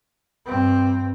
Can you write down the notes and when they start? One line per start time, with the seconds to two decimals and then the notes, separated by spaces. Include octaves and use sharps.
0.46 G2 C4